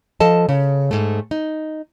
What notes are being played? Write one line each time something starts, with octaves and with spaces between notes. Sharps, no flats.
F3 A4 D#5 A5
C#3
G#2 A3
D#4